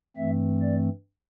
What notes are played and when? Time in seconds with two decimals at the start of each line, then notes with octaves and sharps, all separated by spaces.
0.17 G2 E3 A3 C4 E5
0.62 D5